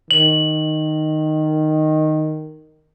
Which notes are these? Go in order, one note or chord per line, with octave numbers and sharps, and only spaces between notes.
D#3 F#7